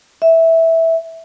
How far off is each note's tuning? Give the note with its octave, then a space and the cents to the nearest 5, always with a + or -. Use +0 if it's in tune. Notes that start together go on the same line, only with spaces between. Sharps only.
E5 -10